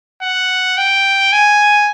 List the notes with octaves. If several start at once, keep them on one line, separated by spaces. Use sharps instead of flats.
F#5
G5
G#5